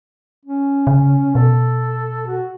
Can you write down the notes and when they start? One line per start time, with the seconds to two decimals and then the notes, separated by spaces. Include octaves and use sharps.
0.45 C#4
0.87 C#3
1.35 B2 A4
2.27 F#4